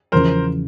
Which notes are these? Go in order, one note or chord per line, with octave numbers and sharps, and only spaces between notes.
E2 C#3 F3 A#4 C5